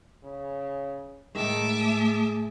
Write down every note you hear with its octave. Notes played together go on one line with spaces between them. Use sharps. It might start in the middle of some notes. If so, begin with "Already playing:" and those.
C#3
A2 D#3 G#3 A3 E5 A5 D6
G#4